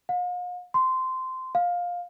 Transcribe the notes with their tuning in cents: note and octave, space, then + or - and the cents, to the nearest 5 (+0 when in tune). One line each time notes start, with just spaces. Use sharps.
F5 +45
C6 -15
F5 +15